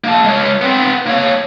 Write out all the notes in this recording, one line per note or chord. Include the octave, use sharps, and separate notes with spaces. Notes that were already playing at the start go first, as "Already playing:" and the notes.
A#3 A5
G#3 C#5
B3 C4
A#3 C#5